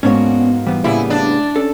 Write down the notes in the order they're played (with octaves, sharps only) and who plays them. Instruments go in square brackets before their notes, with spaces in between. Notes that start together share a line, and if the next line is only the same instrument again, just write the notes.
[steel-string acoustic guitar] G#2 A#3 F#4 [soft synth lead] B3 [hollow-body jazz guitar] C#4 D4 C#5
[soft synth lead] E3 [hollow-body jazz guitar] G3 B3
[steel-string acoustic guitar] A2 C#3 [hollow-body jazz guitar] G3 A#3 B3 [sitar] E4 [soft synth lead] G#5
[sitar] D4 [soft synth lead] A6
[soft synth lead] C#4 [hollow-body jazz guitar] A4